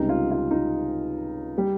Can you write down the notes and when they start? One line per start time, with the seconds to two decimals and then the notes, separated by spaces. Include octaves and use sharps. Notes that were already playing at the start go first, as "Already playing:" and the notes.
Already playing: C#2 C3 G3 D#4
0.09 F4
0.31 F4
0.51 D#4
1.58 G3